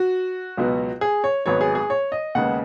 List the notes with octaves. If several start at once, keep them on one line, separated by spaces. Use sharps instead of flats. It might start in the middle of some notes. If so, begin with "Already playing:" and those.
Already playing: F#4
C#2 B2 F#3 B3
G#4
C#5
G#1 G#2 F#3 B3 C#5
G#4
G#4
C#5
D#5
D#2 C#3 G#3 B3 F#5